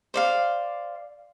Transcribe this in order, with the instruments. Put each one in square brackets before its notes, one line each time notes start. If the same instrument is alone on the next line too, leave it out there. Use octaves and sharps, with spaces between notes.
[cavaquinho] C5 D5 F5